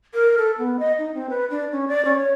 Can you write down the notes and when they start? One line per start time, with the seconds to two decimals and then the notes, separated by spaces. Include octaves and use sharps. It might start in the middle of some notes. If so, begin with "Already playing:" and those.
0.14 A#4
0.38 A4
0.58 B3
0.80 D#5
0.99 D#4
1.14 C4
1.30 B4
1.50 D4
1.72 C#4
1.88 D5
2.05 C#4
2.18 C#5